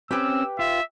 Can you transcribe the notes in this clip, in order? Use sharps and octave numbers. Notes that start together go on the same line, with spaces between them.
C4 C#4 G4 B4 G5 E6
F4 E5